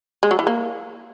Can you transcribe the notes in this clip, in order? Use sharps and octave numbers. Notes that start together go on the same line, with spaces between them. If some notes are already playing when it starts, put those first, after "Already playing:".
G#3
F#3
E3
A#3